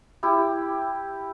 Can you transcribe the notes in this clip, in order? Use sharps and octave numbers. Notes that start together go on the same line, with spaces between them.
E4 G4